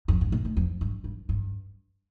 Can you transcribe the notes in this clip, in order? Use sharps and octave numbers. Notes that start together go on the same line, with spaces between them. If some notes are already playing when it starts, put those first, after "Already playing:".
F2
G2
A#2
A2
F2
G2
G2
G2